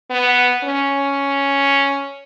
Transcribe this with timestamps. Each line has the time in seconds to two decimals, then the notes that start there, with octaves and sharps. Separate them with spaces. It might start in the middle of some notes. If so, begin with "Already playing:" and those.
0.10 B3
0.64 C#4